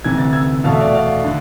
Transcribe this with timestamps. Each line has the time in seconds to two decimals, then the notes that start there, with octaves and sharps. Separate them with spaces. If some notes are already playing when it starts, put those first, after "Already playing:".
0.04 D2 C3 E3 G#6
0.18 A6
0.33 E6 G#6
0.64 E2 B2 A3 F5 A5
0.72 E5
0.79 D5 F5
0.94 D5 F5
1.25 D3